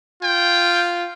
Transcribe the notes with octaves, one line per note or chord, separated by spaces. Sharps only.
F4 G5